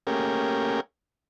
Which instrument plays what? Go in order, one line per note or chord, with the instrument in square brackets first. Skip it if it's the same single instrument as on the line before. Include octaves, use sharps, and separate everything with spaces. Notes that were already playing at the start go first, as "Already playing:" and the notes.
[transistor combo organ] A3 A#3 C#4 G4 G#4 A#4